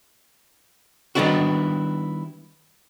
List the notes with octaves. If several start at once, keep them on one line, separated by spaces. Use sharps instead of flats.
D#3 G3 B3 D4 E4 F#4